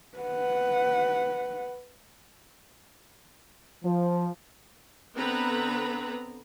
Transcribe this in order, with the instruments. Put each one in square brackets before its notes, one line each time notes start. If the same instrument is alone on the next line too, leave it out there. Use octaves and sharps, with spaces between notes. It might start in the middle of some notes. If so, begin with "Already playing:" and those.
[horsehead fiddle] B4 F#5
[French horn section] F3
[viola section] D3 B3 C4 B4 A#5 B5